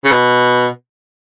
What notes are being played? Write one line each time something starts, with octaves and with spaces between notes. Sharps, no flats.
C#3
B2